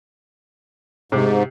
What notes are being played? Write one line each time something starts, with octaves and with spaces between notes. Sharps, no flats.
G#2 C3 D6